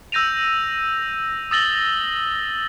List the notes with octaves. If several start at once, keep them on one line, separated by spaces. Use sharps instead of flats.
E6 G6 A#6 D#7 F7
D#6 E6 A6 A#6 F#7 G7